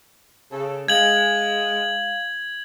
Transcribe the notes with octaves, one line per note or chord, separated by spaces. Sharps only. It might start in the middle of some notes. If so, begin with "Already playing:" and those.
C#3 A4
G#3 F5 G#6 F#7